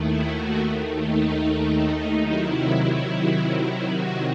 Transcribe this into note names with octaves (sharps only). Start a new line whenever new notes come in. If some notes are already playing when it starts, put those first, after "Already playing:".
Already playing: D#2 D#3 A3 E4
F#4
D#4
C3 D#3 F#3 E4
E4
F#4